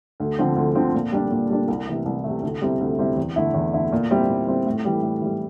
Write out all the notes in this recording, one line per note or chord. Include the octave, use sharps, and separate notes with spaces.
D2
D3 F3 C4
D2
D3 F3 C4
A#2
G3 D4
A#2
G3 D4
C2
C3 E3 A3
C2
C3 E3 A3
D2
C3 G3 C4 E4
D2
C3 G3 C4 E4
E2
D3 A3 E4
E2
D3 A3 E4
A#2
G3 C4 E4
A#2
G3 C4 E4
A2
E3 G3
A2
E3 G3